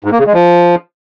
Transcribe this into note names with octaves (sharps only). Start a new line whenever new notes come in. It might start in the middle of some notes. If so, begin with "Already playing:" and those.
G#2
A#3
C#3
G#3
F3